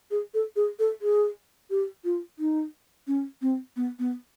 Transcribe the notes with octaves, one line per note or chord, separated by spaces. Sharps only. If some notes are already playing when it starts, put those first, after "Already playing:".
G#4
A4
G#4
A4
G#4
G4
F4
D#4
C#4
C4
B3
B3